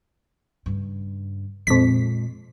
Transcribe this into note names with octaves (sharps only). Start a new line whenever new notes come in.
G2 C#3
F2 A#2 G#3 B6